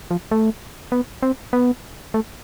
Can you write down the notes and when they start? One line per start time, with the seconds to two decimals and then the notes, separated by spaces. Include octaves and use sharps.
0.11 F3
0.31 A3
0.92 B3
1.22 C4
1.53 B3
2.14 A3